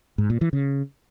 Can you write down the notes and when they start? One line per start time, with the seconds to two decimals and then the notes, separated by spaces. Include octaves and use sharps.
0.18 G#2
0.30 A#2
0.41 E3
0.53 C#3